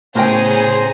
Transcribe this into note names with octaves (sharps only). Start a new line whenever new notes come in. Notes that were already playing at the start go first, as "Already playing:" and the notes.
A2 C#3 B3 G#4 A#4 C5 G5 A#5